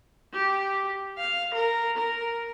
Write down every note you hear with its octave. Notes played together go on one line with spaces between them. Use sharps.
G4
F5
A#4
A#4